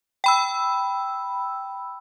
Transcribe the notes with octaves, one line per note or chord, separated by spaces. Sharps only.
G5 B5 E6